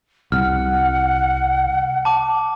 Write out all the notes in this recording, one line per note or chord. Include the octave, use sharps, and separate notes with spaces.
C2 F#5 F6
A5 D6